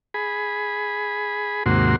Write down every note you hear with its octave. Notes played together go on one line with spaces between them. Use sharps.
G#4 B5
D#2 G#2 C3 A#3 F#4 C6